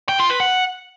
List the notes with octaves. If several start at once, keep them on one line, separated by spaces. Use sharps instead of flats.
G5
F4
B4
F#5